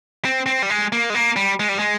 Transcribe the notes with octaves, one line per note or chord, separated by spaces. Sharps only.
C4
C4
G3
G#3
A#3
G#3
A#3
G3
G#3
G3
G#3